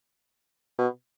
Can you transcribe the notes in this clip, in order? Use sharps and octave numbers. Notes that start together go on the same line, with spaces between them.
B2